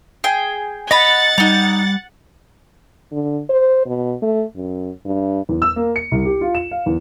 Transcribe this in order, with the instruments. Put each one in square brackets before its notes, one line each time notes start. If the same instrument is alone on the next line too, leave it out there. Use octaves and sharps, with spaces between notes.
[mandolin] G#4 G5
[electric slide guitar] D#5 [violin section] F#5 A6 [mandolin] A#5 B5
[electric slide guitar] G3 [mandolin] D#4 A#5
[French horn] D3
C5
B2
A3
F#2
G2
[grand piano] E2
E6
A#3
C#7
C2
G4
F4
E7
F5
E2